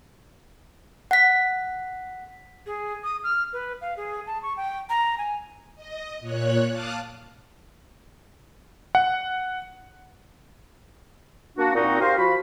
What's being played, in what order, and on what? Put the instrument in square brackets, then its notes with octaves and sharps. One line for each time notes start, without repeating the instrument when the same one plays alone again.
[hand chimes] F#5 B6
[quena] G#4
D#6
F6
B4
F5
G#4
A5
C#6
G5
A#5
G#5
[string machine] D#5
A#2 C#5 F#6
F5 A5 D6 D#6 F6 F#6
[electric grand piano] F#5
[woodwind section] A#3 D4 F#4
A#2 C4 D#4 F#4
G4 A#4 C5 F5
F3 F#4 B5